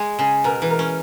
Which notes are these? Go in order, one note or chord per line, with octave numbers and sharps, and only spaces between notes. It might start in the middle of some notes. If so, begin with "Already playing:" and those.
Already playing: G#3 G#5
C#3 G#4
B2 A#4
E3
A#4
C#4